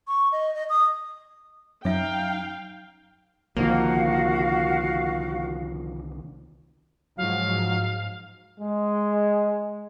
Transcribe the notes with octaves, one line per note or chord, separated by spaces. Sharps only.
C#6
D#5
D#5
D#6
F#2 F#3 D#4 E5 F5 G5
C2 D3 D#3 F3 A#3 F#4 F5
G#2 F3 F#3 F5
G#3